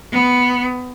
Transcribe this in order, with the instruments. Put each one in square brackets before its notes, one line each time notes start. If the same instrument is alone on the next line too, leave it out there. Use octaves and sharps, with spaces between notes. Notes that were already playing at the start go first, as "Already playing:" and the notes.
[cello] B3